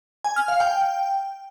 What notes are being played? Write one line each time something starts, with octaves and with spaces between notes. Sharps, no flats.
G#5
F6
F5
G5